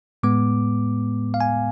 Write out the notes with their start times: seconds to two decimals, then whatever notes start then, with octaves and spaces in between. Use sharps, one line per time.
0.23 A2 G#3 B3 D6
1.34 F5
1.41 G#5